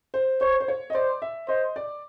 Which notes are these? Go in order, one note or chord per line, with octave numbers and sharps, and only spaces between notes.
C5
C5 C#5
C5
C#5
D#5
C5 D5
E5
C5 D#5
D5